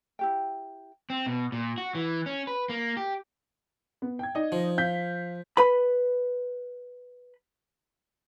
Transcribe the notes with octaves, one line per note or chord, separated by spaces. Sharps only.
E4 G4 G5
C4
B2
A#2
F#4
E3
C#4
B4
A#3
G4
B3
G5 G#6
D#4 D5 D#5
F3
F5 G6 B6
B4 B5